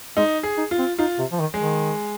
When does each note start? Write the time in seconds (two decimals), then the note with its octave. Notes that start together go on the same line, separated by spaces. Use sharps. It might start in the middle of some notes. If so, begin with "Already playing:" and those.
0.17 G#3 D#4
0.43 G#4
0.57 D#4
0.71 F4
0.78 C4
0.99 D#4 F4
1.19 C3
1.32 F3
1.40 D#3
1.54 G#3
1.61 D#3